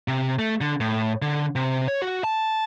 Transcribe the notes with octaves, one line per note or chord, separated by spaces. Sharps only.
C3
A3
D3
A2
D3
C3
C#5
F#4
A5